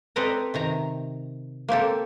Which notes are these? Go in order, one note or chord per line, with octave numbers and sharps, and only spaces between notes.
C4 A4 B4 D5 D#5 A#5
C3 D#3 A#5
A#3 C4 G4 A4